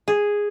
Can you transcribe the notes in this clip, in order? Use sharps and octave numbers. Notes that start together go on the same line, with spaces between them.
G#4